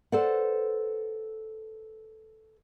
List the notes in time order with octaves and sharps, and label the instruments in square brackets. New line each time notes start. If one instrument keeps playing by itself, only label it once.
[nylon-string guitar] A4 B4 C5 D5 F#5